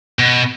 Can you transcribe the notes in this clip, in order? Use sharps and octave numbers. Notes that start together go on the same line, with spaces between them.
B2